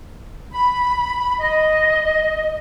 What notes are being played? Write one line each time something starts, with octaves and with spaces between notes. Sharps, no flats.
B5
D#5